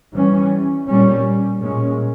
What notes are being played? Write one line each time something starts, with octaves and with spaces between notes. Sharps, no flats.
E3 G3 C#4
A#2 G3 C#4
A#2 G#3 C#4